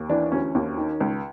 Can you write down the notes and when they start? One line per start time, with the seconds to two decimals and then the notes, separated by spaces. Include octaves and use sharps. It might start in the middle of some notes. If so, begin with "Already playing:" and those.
Already playing: D#2
0.09 E3 D4
0.32 D2 C#4
0.55 D#2
0.78 D#3
1.00 C#2